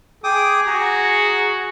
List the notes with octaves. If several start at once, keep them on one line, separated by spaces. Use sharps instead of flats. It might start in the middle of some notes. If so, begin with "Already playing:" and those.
G#4 G5 D6 D#6
F#4 A#5